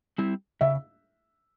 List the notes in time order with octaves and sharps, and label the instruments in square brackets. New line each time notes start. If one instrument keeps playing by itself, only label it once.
[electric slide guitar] G3 C4 E4
[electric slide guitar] C#3 [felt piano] E5